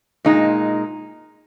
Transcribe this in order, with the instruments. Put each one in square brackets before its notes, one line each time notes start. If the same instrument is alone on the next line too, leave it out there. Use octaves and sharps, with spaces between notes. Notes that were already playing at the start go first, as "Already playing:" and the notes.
[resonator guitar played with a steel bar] A#2 G#3 D#4